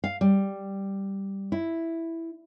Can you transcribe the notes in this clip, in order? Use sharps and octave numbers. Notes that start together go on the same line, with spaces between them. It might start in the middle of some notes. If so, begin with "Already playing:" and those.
F5
G3
E4